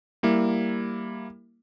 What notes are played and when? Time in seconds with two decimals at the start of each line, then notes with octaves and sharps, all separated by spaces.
0.23 G3 A#3 E4